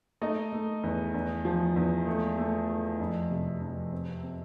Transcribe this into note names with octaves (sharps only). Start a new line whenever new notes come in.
A3 D#4 D#5
A3
E2
E2
F3
E2
A3
A3
A3
F2
C3
F2
C4
C4